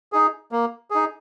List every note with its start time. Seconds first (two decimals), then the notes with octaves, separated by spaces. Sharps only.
0.13 D#4 G#4
0.52 A#3
0.91 D#4 G#4